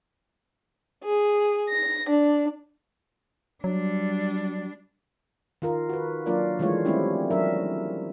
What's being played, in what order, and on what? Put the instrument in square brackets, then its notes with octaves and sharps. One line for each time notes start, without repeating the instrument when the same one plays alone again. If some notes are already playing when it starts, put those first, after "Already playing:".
[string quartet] G#4
A#6
D4
[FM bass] F#3 [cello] G3 D4
[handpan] D#3 F4 A#4
F#4 B4
F#3 A#3 D4 F4 A#4 D5
D#3 E3 G#3 A3 F4 C#5
G3 A3 C4 C#4 E4 G4
F#3 D4 A#4 E5